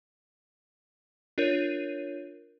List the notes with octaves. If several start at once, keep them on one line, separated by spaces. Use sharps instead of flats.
D4 F4 A#4 C#5 G6 D#7